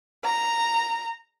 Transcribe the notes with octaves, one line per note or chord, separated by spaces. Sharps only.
A#5